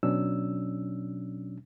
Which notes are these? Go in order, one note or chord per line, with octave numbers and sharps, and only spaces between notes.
B2 F#3 C#4 D4 E6